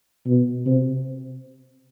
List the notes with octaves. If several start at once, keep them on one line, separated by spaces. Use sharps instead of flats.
B2
C3